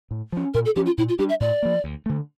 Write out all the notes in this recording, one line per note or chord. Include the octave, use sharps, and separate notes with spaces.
A2
F3 C#4
A#2 A#4
A4
F3 C#4 G4
F4
A#2 E4
F4
G3 D4 G4
E5
A2 D5
F3 A#3
D2
D3 A3